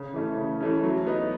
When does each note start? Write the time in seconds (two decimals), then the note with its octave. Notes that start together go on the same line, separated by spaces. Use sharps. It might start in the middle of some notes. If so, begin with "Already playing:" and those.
Already playing: C#3
0.13 E3 A3 C#4
0.37 C#3
0.60 E3 A3 C#4
0.83 F#3
1.07 B3 D#4